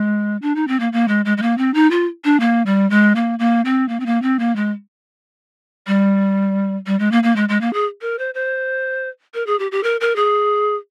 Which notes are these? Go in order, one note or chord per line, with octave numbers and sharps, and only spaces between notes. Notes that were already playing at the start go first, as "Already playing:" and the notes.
Already playing: G#3
D4
D#4
C4
A#3
A#3
G#3
G#3
G#3
A#3
C4
D#4
F4
D4
A#3
G3
G#3
A#3
A#3
C4
A#3
C4
A#3
C4
A#3
G#3
G3
G3
G#3
A#3
A#3
G#3
G#3
A#3
G#4
A#4
C5
C5
A#4
G#4
G4
G4
A#4
A#4
G#4